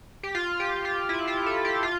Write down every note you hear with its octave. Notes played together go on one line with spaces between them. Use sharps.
G4
F4
G4
F4
E4
F4
A4
G4
F4